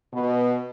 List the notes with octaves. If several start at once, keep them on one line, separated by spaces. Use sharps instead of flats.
B2